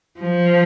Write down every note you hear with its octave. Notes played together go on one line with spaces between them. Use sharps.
F3